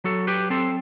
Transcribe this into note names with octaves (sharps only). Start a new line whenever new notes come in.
F#3 F#4 A4
G4 B4
C4 A4 C5